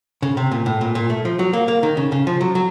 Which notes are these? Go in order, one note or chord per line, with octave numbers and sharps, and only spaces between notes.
C#3
C3
A#2
A2
A#2
A#2
A3
F3
F#3
A#3
A#3
D#3
C#3
C#3
F3
F#3
F#3